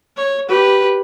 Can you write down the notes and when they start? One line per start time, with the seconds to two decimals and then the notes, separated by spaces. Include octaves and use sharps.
0.17 C#5
0.49 G4 B4